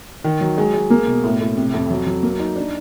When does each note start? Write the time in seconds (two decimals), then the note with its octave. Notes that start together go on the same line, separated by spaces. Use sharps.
0.24 D#3
0.41 F#3
0.58 G#3
0.74 G#3
0.90 A#3
1.07 B2
1.24 A2
1.40 A2
1.57 C3
1.74 F2
1.90 F#3
2.06 F#3
2.23 A#3
2.40 D#4
2.56 D4